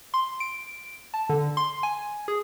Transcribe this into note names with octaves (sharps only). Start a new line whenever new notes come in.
C6
D7
A5
D3
C6
G#5
G#4